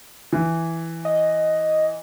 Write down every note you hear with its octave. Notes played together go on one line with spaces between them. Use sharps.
E3
D#5